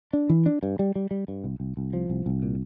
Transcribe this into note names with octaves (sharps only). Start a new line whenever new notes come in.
D4
E3
D4
G2
G3
G3
G3
G2
C2
C2
C2
F3
C2
C2
A#2